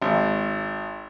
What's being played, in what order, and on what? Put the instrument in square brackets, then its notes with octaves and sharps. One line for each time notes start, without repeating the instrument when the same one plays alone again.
[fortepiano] G#1